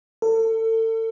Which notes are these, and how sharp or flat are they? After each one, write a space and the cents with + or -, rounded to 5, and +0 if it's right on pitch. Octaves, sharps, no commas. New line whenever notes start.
A4 +35